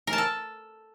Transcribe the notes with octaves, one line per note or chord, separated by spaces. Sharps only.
A#4
A5
A4